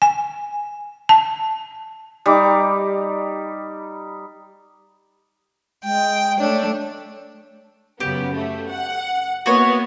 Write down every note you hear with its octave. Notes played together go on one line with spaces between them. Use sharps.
G#5
A5
G3 D#4 D6
G#3 G5
A3 D4 C#5
F#2 C#3 B3 G4
A3
F#5
A#3 B3 E4 F#4 C#5